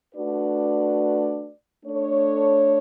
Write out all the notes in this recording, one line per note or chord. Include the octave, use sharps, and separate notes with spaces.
A3 D4 F#4 B4 D5
A3 D4 A4 C#5